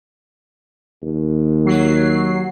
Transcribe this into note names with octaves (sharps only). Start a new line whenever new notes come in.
D#2
F#3 C7